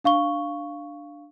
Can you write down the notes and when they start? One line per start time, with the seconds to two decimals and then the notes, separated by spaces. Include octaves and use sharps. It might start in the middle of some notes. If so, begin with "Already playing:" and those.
0.04 D4 F5 C#6 G7